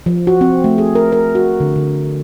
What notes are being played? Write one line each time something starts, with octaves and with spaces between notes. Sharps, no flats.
F3
F#4
C4
A3
G#4
A#4
A#4
F#4
D3
D3